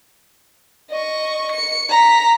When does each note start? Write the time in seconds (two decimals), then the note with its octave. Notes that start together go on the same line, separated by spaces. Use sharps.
0.91 D#5 C#6
1.51 C#7
1.89 A#5 B6